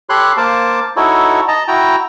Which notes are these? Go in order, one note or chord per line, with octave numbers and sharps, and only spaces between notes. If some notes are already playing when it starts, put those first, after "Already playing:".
G4 A4 C#5 B5 C6 F#6
A#3 C5 F5 A5 D6
D#4 E4 F#4 A4 C#5
D#5 A5 A#5
E4 F#4 G5 A#5